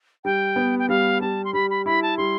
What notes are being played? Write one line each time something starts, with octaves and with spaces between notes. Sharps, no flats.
G3 G5
B3
G5
G3 F5
G3 A5
C6
G3 B5
B5
E4 B5
A5
G3 C6